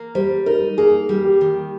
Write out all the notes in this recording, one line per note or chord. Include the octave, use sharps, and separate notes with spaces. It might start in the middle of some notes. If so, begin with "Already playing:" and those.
Already playing: A#3
G3 C5
D#4 A#4
A#3 G#4
G3
G4
D#3